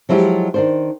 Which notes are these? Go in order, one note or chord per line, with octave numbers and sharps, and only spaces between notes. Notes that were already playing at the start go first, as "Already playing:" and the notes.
F3 F#3 G#3 E4 F4 G4
D#3 D4 C5